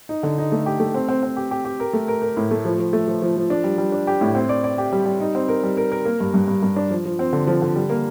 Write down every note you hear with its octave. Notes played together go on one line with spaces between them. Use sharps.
D#4
D3
D#4
A3
G4
A3
C4
C4
C4
G4
G4
G4
A#4
A3
A#4
A#4
A2
A3
F3
F3
A3
F3
F3
F3
D4
G3
G3
D4
G4
A2
C4
D5
D5
G4
G3
G3
D#4
C4
A#4
G3
A#4
A#4
A#3
G2
G2
G2
G2
D4
F3
F3
C4
D3
F3
D3
G3
A#3